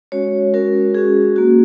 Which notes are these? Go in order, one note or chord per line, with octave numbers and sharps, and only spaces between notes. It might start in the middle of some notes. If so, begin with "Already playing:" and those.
G#3 C#4 F#4 C#5
G#3 C#4 F#4 A#4
G#3 C#4 F#4 G#4
A#3 F#4